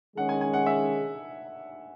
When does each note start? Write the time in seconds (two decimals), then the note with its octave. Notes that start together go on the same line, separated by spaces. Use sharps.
0.16 D#3 G#3 C#4 G#4 F#5
0.29 G#5
0.41 G#5
0.53 F#5
0.66 E5